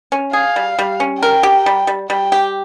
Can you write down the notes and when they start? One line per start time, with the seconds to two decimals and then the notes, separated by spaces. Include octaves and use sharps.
0.12 C#4
0.33 G#4 F5
0.56 G3
0.79 G3
1.00 C#4
1.21 A#4 G5
1.43 G4
1.66 G3
1.87 G3
2.10 G3 G5
2.32 G4